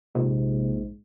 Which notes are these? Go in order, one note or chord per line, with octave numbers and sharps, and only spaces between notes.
A#1 G#2 C3